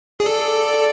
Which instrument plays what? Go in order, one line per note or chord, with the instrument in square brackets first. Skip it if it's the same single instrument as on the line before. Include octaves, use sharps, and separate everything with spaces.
[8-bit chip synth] G#4
[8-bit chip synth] A4 [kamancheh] D5